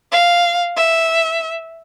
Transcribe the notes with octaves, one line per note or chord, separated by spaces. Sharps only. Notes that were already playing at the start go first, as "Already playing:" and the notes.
F5
E5